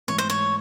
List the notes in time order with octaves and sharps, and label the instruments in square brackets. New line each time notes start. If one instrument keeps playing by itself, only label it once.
[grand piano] G#2 E3 A3 [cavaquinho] C#5
[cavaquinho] C5
C#5